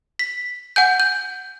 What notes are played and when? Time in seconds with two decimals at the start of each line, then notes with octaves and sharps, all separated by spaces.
0.19 B6
0.76 F#5 G#5 G6
1.00 G6